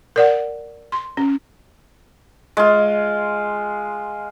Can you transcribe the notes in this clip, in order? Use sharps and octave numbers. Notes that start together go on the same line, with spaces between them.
A#4 D5 F#5
C6
C#4
G#3 F4